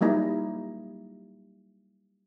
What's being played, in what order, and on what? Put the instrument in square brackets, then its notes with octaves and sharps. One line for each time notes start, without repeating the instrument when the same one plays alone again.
[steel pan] F#3 G3 A#3 D#4 E4